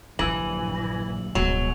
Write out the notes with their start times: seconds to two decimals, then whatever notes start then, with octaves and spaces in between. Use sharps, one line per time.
0.19 A#1 G2 A#2 D3 E3 F#3 E6 F#7
1.35 D1 G1 G#2 B2 F#3 G#3 F7